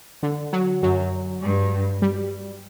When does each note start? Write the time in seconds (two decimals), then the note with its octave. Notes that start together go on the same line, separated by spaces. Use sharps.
0.23 D3
0.53 F#3
0.82 F#2 F#3
1.42 G2
2.02 G3